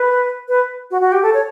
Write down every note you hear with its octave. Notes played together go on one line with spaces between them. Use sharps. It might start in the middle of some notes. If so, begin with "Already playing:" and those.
Already playing: B4
B4
F#4
F#4
G4
A4
C#5